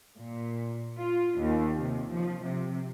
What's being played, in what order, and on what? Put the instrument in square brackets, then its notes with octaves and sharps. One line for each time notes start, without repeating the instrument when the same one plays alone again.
[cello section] A#2
F4
D#2
C3
F3
C3